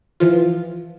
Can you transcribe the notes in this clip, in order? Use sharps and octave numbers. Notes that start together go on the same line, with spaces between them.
E3 F3 F4